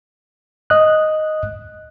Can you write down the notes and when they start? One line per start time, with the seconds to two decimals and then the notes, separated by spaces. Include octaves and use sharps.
0.70 D#5 D#6 F#6